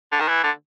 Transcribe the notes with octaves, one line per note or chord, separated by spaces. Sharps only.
D3
D#3
E3
D3